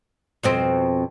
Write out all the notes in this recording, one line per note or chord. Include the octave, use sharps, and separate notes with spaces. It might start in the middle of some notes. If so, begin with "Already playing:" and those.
F2 B2 C4